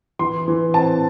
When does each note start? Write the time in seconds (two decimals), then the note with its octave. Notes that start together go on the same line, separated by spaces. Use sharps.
0.19 E3 C6
0.48 E3
0.74 C4 A5